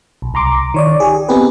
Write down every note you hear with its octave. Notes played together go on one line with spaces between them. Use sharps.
B1
C2 A#5 C6 D6
D#3 C#5 D5
G4 G#4
B3 C4 D#4 G4 G#4 B4